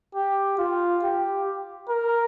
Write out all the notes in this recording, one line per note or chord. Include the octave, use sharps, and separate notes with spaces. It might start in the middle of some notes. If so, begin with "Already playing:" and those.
G4
F4
G4
A#4